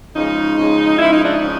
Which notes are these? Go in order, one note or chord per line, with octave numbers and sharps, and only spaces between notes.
C#3 F3 G#3 D#4
C#3 F3 G#3
C#3 F3 G#3 E4
D#4
D4
D#4
C#3 F3